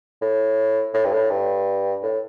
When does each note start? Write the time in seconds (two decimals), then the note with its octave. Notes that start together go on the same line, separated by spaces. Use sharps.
0.22 A2
0.94 A2
1.05 G2
1.12 A2
1.30 G2
2.02 A2